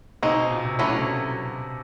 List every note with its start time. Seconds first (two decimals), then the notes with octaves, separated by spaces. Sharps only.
0.23 B2 C4 D#4 G#4
0.51 A#2
0.65 C3
0.79 D3 F#3 A3 C#4 E4
0.89 B2
0.97 C3